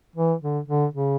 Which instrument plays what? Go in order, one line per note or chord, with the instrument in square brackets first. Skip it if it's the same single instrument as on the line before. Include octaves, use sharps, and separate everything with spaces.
[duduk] E3
D3
D3
C#3